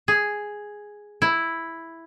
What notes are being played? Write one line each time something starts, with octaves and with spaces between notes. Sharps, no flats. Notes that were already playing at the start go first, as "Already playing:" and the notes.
G#4
E4